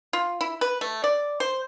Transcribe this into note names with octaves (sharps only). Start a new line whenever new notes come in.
F4
E4
B4
A3
D5
C5